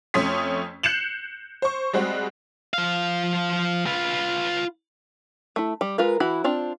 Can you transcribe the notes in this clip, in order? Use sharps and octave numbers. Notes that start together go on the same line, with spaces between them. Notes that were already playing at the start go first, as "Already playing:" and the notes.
F2 A3 C#4 C6 D#6 B6
F#6 G6 C7 C#7 E7 F#7
C5 C#6
G3 G#3 C4 F#4
F3 F5
F4 B4
A3 E4
G3
G#3 F4 A#4 B4
E3 E4 F#4 B5
C4 D4 F4